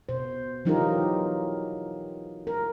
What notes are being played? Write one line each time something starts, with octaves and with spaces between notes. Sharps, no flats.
B2 C5
E3 F#3 D#4 F4 G4 A#4
A#4